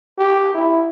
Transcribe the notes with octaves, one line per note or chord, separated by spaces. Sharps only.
G4
E4